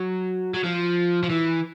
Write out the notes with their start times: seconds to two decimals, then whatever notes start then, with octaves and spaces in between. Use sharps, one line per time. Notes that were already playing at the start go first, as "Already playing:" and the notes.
Already playing: F#3
0.54 F#3
0.64 F3
1.23 F3
1.30 E3